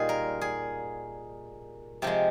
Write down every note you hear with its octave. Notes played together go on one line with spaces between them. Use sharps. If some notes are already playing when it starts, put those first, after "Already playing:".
Already playing: A#2 G3 D#4 F4 G#4
A#4
G#4
C3 F3 G#3 G4